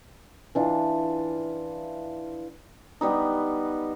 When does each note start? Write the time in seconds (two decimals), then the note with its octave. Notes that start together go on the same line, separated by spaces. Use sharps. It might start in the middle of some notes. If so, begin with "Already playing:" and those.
0.55 E3 D4 F4
3.01 G3 B3 D#4